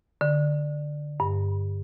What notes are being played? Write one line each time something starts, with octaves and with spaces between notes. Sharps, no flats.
D3
G2